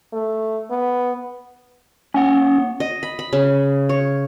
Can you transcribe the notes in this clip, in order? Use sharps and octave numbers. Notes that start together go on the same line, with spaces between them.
A3
B3
A#3 C#4 F#5
D#5
B5
B5
C#3
C#5